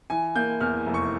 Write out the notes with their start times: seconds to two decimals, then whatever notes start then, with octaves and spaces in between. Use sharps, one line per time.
0.10 E3 G#5
0.36 A#3 G6
0.61 E2 F6
0.86 F1
0.94 C#6